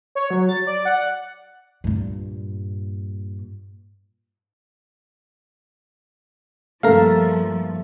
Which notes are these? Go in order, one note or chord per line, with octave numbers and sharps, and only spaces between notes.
C#5
F#3
A6
D5
F#5
G2 A#2
G2 F3 A3 A#3 A4 A#4 E5 F5